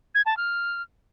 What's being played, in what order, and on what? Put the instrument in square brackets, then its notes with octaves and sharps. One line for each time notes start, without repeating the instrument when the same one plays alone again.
[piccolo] G#6
A5
F6